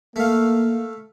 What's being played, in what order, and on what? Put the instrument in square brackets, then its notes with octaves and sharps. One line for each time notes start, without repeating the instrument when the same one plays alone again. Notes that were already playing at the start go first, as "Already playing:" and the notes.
[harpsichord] A3 F5 [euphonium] A#3